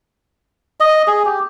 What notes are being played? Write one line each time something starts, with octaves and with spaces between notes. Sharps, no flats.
D#5
G#4
G4